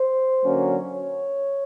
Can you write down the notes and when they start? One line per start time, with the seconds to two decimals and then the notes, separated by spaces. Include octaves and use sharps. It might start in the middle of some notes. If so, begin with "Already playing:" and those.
Already playing: C5
0.44 D3 F#3 A#3 C#4
0.92 C#5